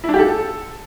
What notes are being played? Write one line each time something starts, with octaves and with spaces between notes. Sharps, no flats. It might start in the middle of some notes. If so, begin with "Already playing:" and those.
E4
D4
G4
A4